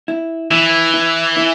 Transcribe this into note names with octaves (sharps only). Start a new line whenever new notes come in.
E4
E3 E4
E4
E4